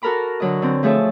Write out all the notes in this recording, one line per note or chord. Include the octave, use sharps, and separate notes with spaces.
F#4 A4 A#4 A#5 B5 D6
D3 F#3 D#5
D3 C4
F3 A3 G#4 C#5 E5 A5